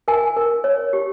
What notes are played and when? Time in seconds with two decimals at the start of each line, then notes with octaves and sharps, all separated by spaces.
0.08 A#4 G#5
0.37 A#4
0.64 C#5
0.93 G4